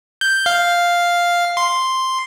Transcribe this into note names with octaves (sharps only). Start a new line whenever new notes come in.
G6
F5
C6